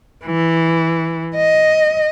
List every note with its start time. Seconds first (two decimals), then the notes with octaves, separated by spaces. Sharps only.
0.25 E3
1.35 D#5